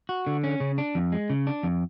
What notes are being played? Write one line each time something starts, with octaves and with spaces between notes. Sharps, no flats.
F#4
D3
C#4
C#3
D4
F2
G#3
C#3
D4
F2